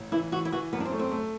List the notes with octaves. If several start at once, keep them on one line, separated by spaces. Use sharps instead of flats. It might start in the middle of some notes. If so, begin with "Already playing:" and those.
Already playing: A1
E3 E4
E3 F#4
E4
E3 F#4
F#2 B3
D4
C4
A3
C4
A3